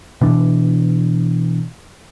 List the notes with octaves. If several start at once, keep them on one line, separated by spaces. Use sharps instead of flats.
B2 E3 D4